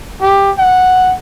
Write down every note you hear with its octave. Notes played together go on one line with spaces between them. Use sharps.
G4
F#5